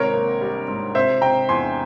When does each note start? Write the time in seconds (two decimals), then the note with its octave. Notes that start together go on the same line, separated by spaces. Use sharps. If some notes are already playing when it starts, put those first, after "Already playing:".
Already playing: G#1 C3 A#4 C#5
0.14 A#3
0.41 G3
0.68 G#2
0.95 C3 C5 E5
1.21 C3 G5 A#5
1.49 E2 G#5 C6